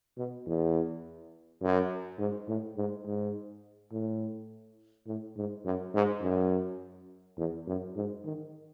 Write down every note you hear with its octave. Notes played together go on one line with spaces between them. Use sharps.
B2
E2
F#2
G#2
A2
G#2
G#2
A2
A2
G#2
F#2
G#2
F#2
E2
F#2
G#2
D#3